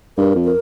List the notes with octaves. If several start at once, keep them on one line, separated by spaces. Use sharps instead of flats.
G2 A#4
F2
A#4